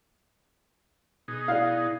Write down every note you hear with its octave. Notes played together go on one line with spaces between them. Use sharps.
B2 D#4 G#4
E4 D5 F5